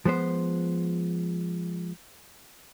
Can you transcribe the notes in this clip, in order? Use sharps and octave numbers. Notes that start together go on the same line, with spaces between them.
F3 G#3 B3 C5